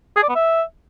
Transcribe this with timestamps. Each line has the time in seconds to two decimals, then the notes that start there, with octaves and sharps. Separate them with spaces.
0.16 G#4
0.22 D5
0.29 B3
0.35 E5